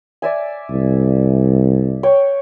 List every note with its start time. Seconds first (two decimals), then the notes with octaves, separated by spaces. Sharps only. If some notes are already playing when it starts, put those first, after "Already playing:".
0.22 D5 E5 G#5
0.70 C2
2.03 C#5 G5